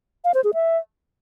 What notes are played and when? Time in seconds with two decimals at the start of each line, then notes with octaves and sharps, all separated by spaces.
0.24 F5
0.34 C5
0.44 G#4
0.54 E5